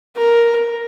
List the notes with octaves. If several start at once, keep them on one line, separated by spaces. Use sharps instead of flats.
A#4